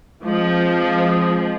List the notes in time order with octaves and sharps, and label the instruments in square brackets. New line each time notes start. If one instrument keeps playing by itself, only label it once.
[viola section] F3 [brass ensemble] G#3 C4 F4 G#4 D#5